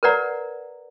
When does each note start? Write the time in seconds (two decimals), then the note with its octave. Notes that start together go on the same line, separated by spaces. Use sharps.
0.03 A#4 B4 C#5 D5 F#5 A#5